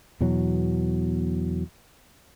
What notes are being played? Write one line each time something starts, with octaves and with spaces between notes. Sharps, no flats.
E2 B2 E3 F#3